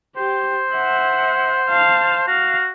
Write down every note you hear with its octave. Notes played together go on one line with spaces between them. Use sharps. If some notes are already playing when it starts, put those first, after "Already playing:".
G4 C5
E5 F#5
F5 A5
F#4 F5